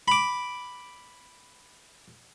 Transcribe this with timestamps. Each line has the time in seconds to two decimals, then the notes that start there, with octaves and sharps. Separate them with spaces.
0.08 B5 D6